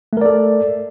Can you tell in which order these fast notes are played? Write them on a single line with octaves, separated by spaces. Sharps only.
A3 A#4 D5 A4